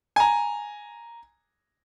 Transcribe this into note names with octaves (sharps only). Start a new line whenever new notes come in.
G#5 A#5